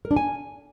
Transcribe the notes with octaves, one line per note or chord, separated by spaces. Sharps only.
A#4
D4
G#5